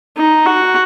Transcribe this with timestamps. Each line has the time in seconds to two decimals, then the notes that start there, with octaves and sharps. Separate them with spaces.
0.17 D#4
0.46 F#4